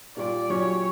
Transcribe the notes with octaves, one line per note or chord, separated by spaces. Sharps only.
A#2 G3 A#3 D5
A#2 F#3 C#4 G4 C#5